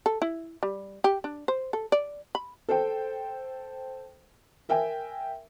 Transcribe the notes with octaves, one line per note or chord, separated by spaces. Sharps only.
A4
E4
G3
G4
D4
C5
A4
D5
B5
A4 C5 G5
A#4 E5 G5 G#5